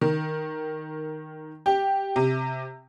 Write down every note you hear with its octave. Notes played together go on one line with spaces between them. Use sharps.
D#3
G4
C3